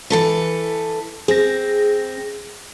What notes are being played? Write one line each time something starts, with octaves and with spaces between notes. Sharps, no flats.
E3 A4 B4
C4 G#4 A#6